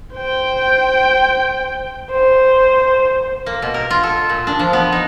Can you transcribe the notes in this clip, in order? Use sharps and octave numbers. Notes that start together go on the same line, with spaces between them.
C5 G5
C5
A#3
B2
A#4
F4
A4
A#2
D4
F3
B3
D#4